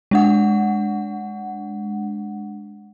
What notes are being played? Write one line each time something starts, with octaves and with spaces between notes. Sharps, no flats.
G#3 D4 F#5